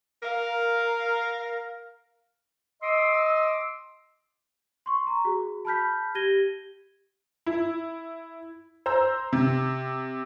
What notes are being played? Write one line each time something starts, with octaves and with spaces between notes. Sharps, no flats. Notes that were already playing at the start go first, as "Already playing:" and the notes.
A#4 F5
D#5 C6 D6 E6
C6 C#6
A#5
F#4 G#4
A5 B5 F6 G6 B6
G4 G#6 A#6 D#7 G7
E4
C5 A#5 E6
C3